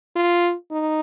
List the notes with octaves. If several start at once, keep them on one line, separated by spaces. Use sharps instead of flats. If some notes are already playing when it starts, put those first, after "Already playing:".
F4
D#4